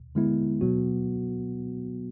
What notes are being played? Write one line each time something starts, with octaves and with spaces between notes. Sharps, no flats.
D3 G#3 B3 E4
B2 F#3 B3 F#4